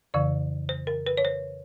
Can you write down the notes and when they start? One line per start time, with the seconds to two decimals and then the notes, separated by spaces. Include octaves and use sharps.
0.14 F2 C#3 E3 D5
0.69 C5
0.87 A#4
1.07 B4
1.17 C#5
1.25 C5